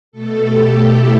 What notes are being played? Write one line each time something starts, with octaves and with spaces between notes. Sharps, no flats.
B2 A3 A4
G4
E4